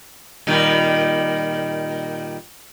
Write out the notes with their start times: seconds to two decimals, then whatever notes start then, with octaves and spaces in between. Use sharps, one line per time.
0.47 A#2 D#3 G3